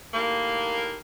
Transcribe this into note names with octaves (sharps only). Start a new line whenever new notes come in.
D#2 A2 A#3